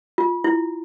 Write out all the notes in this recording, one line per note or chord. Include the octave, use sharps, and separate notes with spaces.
F4
E4